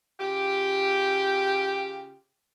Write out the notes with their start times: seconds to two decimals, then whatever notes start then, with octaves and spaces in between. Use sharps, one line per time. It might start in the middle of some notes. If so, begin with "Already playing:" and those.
0.20 C#3 F4 G4